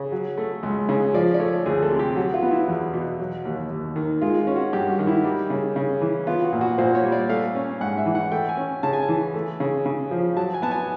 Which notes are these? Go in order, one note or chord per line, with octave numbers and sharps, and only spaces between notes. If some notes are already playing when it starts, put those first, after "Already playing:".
Already playing: C#3
F#3
A3
C#2
C#3
F3 D5
D5
A3 C#5
D2 G#4
A4
C3
G4
F#3 F#4
F4
B3
E4
E2
B2
F#3
D#2
D#2
D#3
G#3 F4
F4
C#4
F#4
G2 G4
F#4
D#3
E4
G3
C#3
C#3
E3
B3 F4
F#4
A#2
F#4
A#2 C5
C#5
G3
D5
A3 F5
C#4
G#2 F#5
E5
E3
F#5
A3 G5
G#5
C#4
C#3 A5
G#5
A5
E3
A3
C#3
C#3
F3
F#3 A5
G#5
B3 A5
G#5